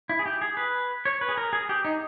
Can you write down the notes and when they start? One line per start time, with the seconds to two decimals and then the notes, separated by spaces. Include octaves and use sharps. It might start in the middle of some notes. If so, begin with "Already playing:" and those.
0.09 E4
0.19 G#4
0.26 G4
0.41 G#4
0.57 B4
1.05 C#5
1.21 B4
1.29 G#4
1.37 A#4
1.53 G#4
1.69 G4
1.85 D#4